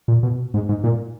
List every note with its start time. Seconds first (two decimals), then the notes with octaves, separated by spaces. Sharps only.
0.08 A#2
0.23 B2
0.54 G#2
0.69 G#2
0.84 A#2